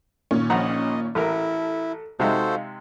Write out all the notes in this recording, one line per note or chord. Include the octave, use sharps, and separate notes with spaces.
A#2 D#3 C#4
A#1 D#5 F#5 A#5
A1 E4 A4 A#4
C3 G#3 D#4 F#4 A4 C5 E5 F5